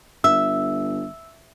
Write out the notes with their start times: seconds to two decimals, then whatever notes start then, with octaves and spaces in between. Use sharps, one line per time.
0.24 G1 E5 E6